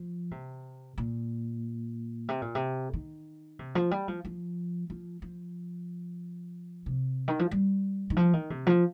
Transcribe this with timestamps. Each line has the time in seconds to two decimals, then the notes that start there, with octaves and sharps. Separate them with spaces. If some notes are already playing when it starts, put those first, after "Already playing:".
Already playing: F3
0.31 C3
0.98 A#2
2.28 C3
2.42 A#2
2.55 C3
2.94 D#3
3.59 C3
3.75 F3
3.91 G3
4.08 F3
4.25 F3
4.90 F3
5.22 F3
6.86 C3
7.28 D#3
7.39 F3
7.51 G3
8.10 D#3
8.16 F3
8.33 D#3
8.50 C3
8.67 F3